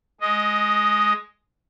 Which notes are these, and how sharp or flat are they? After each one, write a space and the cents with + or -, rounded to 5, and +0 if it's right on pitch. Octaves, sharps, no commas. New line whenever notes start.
G#3 +15 D#5 +0